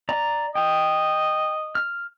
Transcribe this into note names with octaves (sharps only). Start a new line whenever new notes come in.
D5 A#5
D#5 G5
F6